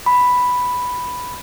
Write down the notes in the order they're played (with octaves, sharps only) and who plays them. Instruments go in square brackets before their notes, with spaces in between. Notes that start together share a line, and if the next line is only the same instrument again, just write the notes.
[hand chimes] B5